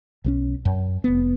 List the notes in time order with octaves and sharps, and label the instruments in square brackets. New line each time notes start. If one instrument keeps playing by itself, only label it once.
[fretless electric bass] B1 F3 C#4
F#2
F1 B3